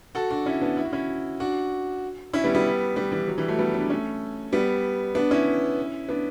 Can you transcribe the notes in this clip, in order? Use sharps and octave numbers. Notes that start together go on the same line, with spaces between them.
F#4 A4
D4 F#4
C#4 E4
B3 D4
E4
F#4
C#4 E4
D4 F#4
C#4 E4
G3 B3
G3 B3
G3 B3
E3 G3
F#3
E3 G3
F#3 A3
G3 B3
B3 D4
A3 C#4
G3 B3
B3 D4
C#4 E4
B3 D4